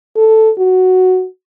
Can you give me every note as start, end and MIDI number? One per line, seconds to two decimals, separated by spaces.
0.16 0.51 69
0.59 1.26 66